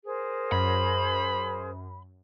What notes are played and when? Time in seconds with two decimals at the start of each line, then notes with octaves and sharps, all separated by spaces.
0.04 G#4 A#4 C5
0.52 F#2 B5